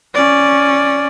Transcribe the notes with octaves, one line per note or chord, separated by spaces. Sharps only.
C#4 D5